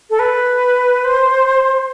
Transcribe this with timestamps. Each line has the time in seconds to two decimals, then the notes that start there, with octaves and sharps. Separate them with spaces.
0.10 A4
0.19 B4
1.05 C5